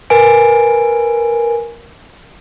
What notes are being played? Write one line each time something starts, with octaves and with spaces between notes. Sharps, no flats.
A#4 B4 G#5 D7